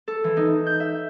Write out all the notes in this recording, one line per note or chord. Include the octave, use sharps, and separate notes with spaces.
A4
E3
D#4
G6
E5